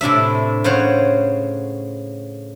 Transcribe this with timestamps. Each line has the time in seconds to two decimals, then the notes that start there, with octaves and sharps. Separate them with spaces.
0.01 A2 C3 D4 E5
0.64 C#3 C5 C#5 F#5